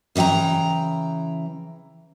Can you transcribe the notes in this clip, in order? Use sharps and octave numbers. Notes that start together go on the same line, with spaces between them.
C#3 E3 D#5 G5 A#5